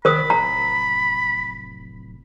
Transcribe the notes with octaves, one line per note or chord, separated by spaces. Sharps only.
F1 D#3 A#4 C5 B5 D#6
D1 A#5